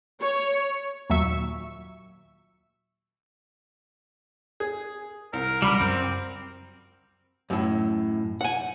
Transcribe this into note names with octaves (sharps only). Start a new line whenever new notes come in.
C#5
D#2 A#2 F#3 E5 C#6 E6
G#4
C2 A#4
C#2 G3 B5 D6
F#2 C4
F#2 A2
F#5 G#5